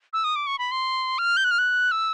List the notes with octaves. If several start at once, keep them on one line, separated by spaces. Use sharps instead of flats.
E6
D#6
D6
C#6
B5
C6
F6
G6
F#6
F6
F#6
E6